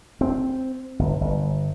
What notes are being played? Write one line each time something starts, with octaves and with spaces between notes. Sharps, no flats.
C4
G1
G1